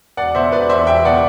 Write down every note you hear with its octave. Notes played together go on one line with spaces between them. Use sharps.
E1 D5 F#5
B2 C5 E5
E1 B4 D5
E2 C5 E5
E1 E5 G5
B2 D5 F#5